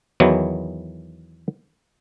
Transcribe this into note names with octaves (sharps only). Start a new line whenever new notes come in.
E2 D#3 E3 F#3